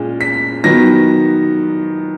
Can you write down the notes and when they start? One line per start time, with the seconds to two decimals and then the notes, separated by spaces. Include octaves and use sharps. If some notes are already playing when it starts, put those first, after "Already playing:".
Already playing: A#2 G#3 C#4
0.21 B6
0.64 D#3 F#3 B3 A#6